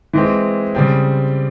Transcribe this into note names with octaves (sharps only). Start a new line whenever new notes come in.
E3 G#3 C4
C#3 G3 C4